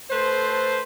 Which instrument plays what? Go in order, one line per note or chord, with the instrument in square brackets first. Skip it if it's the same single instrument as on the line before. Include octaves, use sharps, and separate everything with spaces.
[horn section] A3 A4 B4 C5